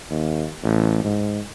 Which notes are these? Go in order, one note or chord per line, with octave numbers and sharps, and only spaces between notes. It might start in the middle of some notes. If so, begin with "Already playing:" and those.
D#2
A1
G#2